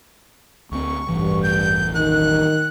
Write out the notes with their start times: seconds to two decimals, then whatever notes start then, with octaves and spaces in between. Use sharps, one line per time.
0.72 D2 C4 C#6
1.09 E1 A1 G2 E3
1.43 G6
1.94 D#3 F#6